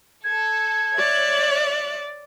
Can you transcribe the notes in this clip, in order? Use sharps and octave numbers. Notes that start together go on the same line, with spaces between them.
A4 G#6
C#5 D5 E5 F#6